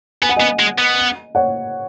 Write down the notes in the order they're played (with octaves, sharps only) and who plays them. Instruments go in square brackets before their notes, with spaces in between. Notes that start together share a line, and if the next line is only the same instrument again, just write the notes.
[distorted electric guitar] B3 [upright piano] G#5
[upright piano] F#5
[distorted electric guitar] B3 [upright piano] D#5 G#5
[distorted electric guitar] G#3
B3
[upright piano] C#5 F#5